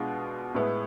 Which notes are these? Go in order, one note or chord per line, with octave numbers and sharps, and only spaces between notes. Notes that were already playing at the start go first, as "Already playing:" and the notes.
Already playing: B2 G#3 D4 F4
A2 G#3 B3 E4